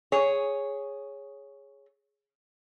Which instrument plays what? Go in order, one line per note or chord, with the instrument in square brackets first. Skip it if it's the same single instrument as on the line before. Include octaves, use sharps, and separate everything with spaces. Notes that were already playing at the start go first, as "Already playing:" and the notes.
[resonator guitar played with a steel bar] G#4 C#5